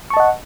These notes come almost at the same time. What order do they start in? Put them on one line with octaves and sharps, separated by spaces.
C#6 A5 D#5 F#5